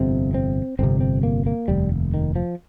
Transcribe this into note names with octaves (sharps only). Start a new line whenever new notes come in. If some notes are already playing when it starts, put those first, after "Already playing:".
Already playing: G1 F2 C3 C4
C4
G1 F2 C3 C4
C4
A#3
A#3
F1 D#2 G3
D#3
F3